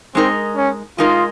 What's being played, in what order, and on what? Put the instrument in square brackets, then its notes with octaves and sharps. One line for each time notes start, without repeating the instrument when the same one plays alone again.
[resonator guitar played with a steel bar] G#3 D#4 A#4 [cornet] C4
[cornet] C#4
[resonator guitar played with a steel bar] G#3 D#4 A#4 [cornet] F4